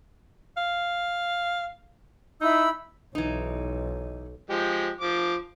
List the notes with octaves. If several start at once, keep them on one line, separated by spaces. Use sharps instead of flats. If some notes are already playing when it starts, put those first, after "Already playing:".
F5
D#4 E4 B5 E6
B1 E3 D#4
F3 G#3 G4
F3 D6